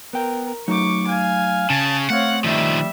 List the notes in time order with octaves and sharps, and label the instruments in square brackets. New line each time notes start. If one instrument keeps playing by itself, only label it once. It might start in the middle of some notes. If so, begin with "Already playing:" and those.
[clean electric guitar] B3 G5 [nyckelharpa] A#4
[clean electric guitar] F#3 A3 D#4 [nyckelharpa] C#6 D6
[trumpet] F5 [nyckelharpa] G#5
[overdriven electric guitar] C#3 [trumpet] A5
[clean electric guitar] A3 [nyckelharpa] C4 C#5 [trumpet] F5 [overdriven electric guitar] F#5
[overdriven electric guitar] D#3 F3 [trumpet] G3 [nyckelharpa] E5